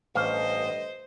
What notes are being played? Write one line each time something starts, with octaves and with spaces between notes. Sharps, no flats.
A1 G2 A3 C5 D#5 F5